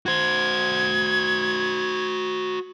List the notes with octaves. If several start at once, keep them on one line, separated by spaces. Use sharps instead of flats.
F#4 C5 G#6